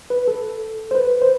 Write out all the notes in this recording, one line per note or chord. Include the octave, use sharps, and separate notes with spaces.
B4
A4
C5
B4
C5